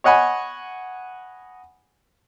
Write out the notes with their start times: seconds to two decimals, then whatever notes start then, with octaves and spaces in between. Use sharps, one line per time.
0.04 C#5 D#5 F#5 G#5 B5